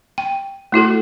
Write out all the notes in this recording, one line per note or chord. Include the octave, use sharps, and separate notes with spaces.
G5
A3 E4 F#4 A4